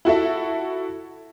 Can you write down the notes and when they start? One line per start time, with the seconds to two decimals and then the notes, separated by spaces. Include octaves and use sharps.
0.05 E4 F#4 A4 E5